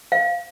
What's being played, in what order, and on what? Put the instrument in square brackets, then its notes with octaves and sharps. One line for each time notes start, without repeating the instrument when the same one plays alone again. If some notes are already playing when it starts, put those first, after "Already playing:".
[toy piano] F5